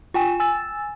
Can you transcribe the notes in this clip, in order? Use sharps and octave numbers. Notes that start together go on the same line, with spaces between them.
F4 G5 G#5
G#5 E6 A6